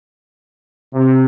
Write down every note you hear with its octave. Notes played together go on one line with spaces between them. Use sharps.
C3